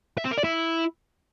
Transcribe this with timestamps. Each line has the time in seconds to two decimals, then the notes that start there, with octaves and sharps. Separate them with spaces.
0.18 E5
0.24 C4
0.31 A#4
0.38 D5
0.44 E4